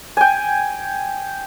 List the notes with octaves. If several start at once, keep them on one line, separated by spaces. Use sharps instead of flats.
G5 G#5